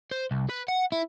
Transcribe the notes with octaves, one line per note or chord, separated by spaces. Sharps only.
C5
C2
B4
F#5
E4